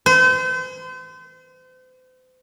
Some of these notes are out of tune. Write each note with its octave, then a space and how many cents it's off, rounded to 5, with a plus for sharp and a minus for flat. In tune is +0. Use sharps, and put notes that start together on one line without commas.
C5 -40